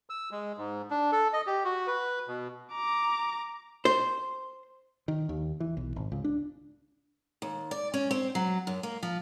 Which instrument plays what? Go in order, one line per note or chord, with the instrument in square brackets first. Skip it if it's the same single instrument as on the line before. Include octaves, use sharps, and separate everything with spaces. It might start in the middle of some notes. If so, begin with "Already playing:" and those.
[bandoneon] E6
G#3
G#2
D4
A4
D#5
G4
F#4
B4
B2
[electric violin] A#5 D6
[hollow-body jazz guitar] C5
[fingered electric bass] D#3
D#2
E3
B1
G#1
C#2
D4
[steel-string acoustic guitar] D#2
D5
C#4
C4
F#3
F#2
A#3
F3